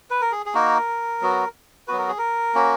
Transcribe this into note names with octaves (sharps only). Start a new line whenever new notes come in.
B4
A#4
G#4
G#4
A#3 D#4 F#4 A#4
F#3 B3 F#4
F#3 B3 F#4 B4
A#4
G#4
A#4
A#3 C#4 F#4